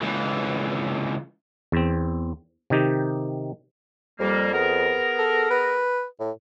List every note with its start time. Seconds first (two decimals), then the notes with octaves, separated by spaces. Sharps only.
0.02 C#2 E3
1.72 E2 C4
2.70 C3 D#3 D#4 G4
4.20 F2 G3 A#3
4.53 B3 G#4 A#4
5.19 A4
5.50 B4
6.20 A2